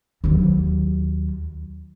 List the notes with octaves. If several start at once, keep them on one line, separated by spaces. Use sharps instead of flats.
D#2 F#3